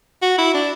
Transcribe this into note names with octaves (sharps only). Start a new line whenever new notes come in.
F#4
E4
D4